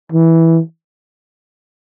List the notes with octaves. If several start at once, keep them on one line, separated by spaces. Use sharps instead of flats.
E3